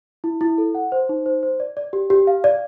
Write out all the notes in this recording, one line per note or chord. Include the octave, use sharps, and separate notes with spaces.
E4
E4
A4
F#5
C5
D#4
C5
C5
D5
D5
G4
G4
F5
D5